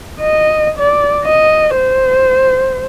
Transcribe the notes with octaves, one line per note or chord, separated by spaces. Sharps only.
D#5
D5
D#5
C5